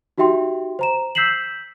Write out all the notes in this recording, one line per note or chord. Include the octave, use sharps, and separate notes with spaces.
D#4 F#4 G4 E5 G5 C6
C5 A#5 E7
E6 G6 B6 C7 E7 F#7